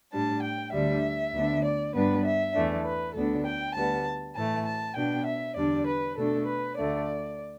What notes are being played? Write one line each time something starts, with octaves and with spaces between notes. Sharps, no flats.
A2 G3 D4 A5
G5
D2 D3 G3 D4 E5
D2 D3 B3 D4
D5
G2 G3 B3 D4 B4
E5
E2 E3 A3 D4
B4
D2 D3 B3 D4 A4
G5
D2 D3 G3 B3 A5
A2 E3 A3 A5
A5
B2 B3 D4 G5
E5
E2 D3 G3 D4 D5
B4
B2 A3 D4 A4
B4
D2 D3 A3 D5